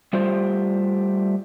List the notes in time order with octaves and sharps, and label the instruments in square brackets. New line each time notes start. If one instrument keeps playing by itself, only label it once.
[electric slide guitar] G3 A3 F4 G4 C5